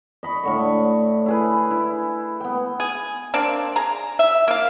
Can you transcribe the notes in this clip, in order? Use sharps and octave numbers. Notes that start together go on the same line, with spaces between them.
D#5 B5 C#6
A2 D3 C#6
E4 G#4 B4
E4
B3 G5
G#4
A#3 C4 D4
G#4 A#5
E5
A#3 F5